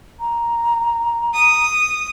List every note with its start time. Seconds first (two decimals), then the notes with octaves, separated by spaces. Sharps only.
0.20 A#5
1.34 D#6